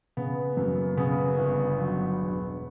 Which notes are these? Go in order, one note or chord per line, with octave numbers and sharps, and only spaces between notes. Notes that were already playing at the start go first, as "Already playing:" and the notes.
C#3 B3
F#2
C#3 B3
G1
F#3
E1